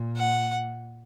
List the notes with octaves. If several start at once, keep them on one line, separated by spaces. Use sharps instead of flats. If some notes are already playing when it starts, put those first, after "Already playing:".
Already playing: A#2
F#5